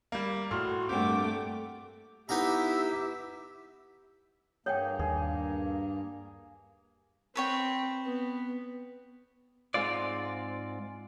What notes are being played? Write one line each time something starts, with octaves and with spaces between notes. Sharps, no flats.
G3 A#3
A2 F#4 C6 F6
G2 A3 A#3 C4 G4 F#5 G5 D6
B3 D#4 E4 G4 E5 A#5
G2 A#3 G#4 C#5 F#5 G5
D#2 G#4
C4 B4 C#5 G5
B3
G#2 G#3 C4 F4 D5